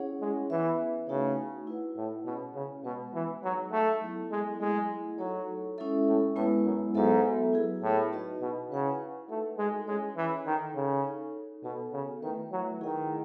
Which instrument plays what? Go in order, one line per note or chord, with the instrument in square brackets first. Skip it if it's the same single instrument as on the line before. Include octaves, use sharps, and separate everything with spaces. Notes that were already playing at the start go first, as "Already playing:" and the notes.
Already playing: [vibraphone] C#4 E4 G#4 C#5 F#5
[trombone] G#3
[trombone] E3 [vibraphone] B3 E4 B4 E5
[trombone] C#3 [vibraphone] A3 D#4 F#4 C#5 F#5
[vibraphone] E4 B4 F#5
[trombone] A2
[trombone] B2 [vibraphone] C#4 G#4 C#5
[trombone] C#3
[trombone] B2 [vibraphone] G#3 B3 F#4 B4
[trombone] E3
[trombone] F#3 [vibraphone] D#4 G#4 D#5 F#5
[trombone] A3
[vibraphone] F#3 B3 E4 A4
[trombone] G#3
[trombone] G#3 [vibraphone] A3 E4 G#4 D#5 F#5
[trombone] F#3 [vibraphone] D#4 F#4 A4 C#5
[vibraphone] G#3 C#4 E4 A4 E5
[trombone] A2
[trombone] A2 [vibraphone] G#3 B3 E4 B4
[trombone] F#2
[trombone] G#2 [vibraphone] F#3 B3 F#4 A4 E5
[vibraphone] E4 G#4 B4
[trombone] A2
[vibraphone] D#4 F#4 B4 D#5
[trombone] B2
[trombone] C#3 [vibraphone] E4 B4 F#5
[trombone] A3 [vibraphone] D#4 F#4 A4
[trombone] G#3
[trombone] G#3 [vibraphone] C#4 E4 G#4 C#5
[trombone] E3
[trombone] D#3 [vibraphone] D#4 A4 D#5 F#5
[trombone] C#3
[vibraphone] D#4 A4 C#5
[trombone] B2 [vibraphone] B3 F#4 A4
[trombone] C#3
[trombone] D#3 [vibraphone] A3 E4 B4 E5
[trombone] F#3
[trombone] D#3 [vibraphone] E4 G#4 D#5 F#5